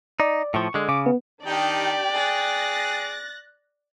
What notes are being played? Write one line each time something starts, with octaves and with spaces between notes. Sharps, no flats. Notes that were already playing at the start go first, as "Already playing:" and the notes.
D#4 D5
A2 F3 C#6
D3 G#3
C#3 D6
B3
D#3 D4 D#4 G4 D5 G5
G#4 F#6 A6 A#6